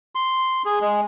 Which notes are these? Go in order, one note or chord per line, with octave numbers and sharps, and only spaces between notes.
C6
G#4
G#3